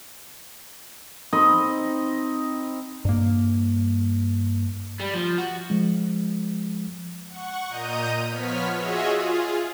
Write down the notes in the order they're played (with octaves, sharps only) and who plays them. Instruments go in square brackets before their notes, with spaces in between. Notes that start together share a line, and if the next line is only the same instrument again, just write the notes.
[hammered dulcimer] C4 D#4 D#5 B5
[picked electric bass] G2 A#3
[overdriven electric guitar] G3
F3
F#4
[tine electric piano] F3 G#3
[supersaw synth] F#5 C#6
A#2 D#5 A#5 D#6 G6 D#7
F3 B3 C#5 F6 B6
F4 F#4 G#4 C#5 D#5 E5
F4 G#4